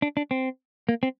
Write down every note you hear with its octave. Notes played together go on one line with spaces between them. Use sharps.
D4
D4
C4
A#3
C4